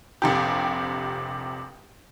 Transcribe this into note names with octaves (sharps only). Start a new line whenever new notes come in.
F1 A#1 C3 G4